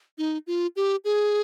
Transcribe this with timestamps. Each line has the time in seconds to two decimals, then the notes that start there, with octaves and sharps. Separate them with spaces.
0.18 D#4
0.47 F4
0.76 G4
1.04 G#4